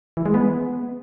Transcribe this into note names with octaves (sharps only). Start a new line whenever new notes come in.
E3
G#3
B3